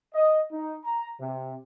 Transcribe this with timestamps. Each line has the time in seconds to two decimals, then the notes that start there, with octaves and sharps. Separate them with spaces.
0.14 D#5
0.52 D#4
0.84 A#5
1.20 C3